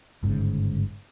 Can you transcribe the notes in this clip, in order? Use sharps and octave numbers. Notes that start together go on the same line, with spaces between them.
G1 G#2 C#3